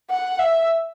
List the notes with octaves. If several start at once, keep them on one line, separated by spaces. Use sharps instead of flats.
F#5
E5